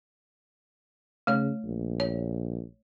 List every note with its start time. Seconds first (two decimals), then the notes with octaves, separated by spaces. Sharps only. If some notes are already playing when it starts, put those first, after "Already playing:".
1.27 C#3 A3 C#5
1.65 A#1
2.00 C#5